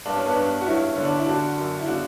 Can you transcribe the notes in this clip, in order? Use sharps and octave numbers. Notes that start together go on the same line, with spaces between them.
G2 D4
C#4
B3 D4
G2
F#4
G2 C#4 E4
D3 C#4
D4
E4
D3 D4 F#4
F#2
E4
C#3 D4 F#4